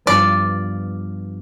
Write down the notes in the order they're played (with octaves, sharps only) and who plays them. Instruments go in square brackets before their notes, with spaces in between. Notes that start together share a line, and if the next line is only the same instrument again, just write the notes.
[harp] G2 F3 B3 D4 F4 [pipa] D5